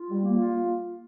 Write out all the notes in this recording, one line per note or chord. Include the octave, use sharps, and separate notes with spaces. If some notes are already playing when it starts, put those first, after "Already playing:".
Already playing: F4
G3
A#3
F4